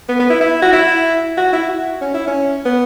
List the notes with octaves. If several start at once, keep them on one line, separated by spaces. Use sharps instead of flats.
B3
B3
E4
E4
F#4
E4
F#4
E4
F#4
C#4
E4
C#4
B3